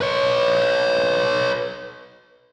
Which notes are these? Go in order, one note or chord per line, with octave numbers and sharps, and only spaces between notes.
B4 C#5